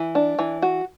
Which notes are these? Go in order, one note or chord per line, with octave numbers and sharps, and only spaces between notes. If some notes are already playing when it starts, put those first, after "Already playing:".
Already playing: E3
D4
E3
F#4